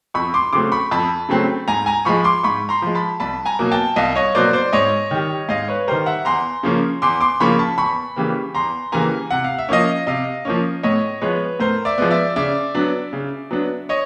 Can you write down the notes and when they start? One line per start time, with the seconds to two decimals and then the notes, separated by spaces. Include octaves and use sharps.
0.14 F2 B5 C#6
0.34 C6 D6
0.53 C#3 F#3 A3 C4 C6 D6
0.72 B5 C#6
0.91 F2 A5 B5
1.29 C#3 F#3 A3 C4
1.68 G#2 G#5 A#5
1.86 G#5 A#5
2.05 F3 G#3 B5 C#6
2.24 C6 D6
2.43 G#2 B5 C#6
2.69 A#5 C6
2.82 F3 G#3
2.95 A5 B5
3.20 C2 A5 B5
3.45 G#5 A#5
3.59 B2 F#3 A#3
3.71 G5 A5
3.96 C2 D#5 F5
4.15 C#5 D#5
4.35 B2 F#3 A#3 C5 D5
4.53 C5 D5
4.73 G#2 C#5 D#5
5.11 D#3 G3
5.49 G#2 D#5 F5
5.68 B4 C#5
5.88 D#3 G3 A#4 C5
6.06 E5 F#5
6.25 E2 A#5 C6
6.63 C#3 F3 A#3 C#4
7.02 E2 C6 D6
7.21 C6 D6
7.40 C#3 F3 A#3 C#4 B5 C#6
7.59 A5 B5
7.78 E2 B5 C#6
8.16 C#3 E3 G3 A#3
8.55 E2 A#5 C6
8.92 C#3 E3 G3 A#3 G#5 A#5
9.31 C3 F#5
9.44 F5
9.58 E5
9.69 F3 A#3 C#4 D#5 F5
10.07 C3 D#5 F5
10.45 F3 A#3 C#4
10.83 A2 C#5 D#5
11.21 F3 G#3 B3 B4 C#5
11.60 A2 A#4 C5
11.85 D5 E5
11.98 F3 G#3 B3
12.11 D5 E5
12.36 C#3 D5 E5
12.75 F#3 B3 D4
13.13 C#3
13.51 F#3 B3 D4
13.89 C#5 D#5